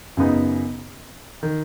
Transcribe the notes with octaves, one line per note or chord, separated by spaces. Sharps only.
F#2 C#3 B3 D#4
D#3